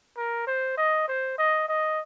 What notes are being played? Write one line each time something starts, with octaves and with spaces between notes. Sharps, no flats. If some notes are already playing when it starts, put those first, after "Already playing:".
A#4
C5
D#5
C5
D#5
D#5